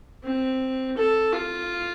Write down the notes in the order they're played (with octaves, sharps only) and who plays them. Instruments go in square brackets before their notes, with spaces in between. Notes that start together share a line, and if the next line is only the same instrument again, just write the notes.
[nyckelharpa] C4
A4
F4